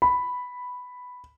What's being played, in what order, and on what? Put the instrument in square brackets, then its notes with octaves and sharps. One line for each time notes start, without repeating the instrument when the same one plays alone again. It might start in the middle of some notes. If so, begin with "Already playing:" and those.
[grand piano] B5